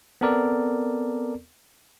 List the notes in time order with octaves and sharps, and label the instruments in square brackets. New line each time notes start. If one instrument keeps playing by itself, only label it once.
[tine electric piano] B3 C4 A4 A#4 D5